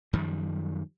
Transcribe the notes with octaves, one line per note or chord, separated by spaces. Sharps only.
F#2 D#3 F3 G3